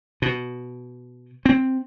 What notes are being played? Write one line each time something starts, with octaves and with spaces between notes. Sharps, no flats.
B2
C4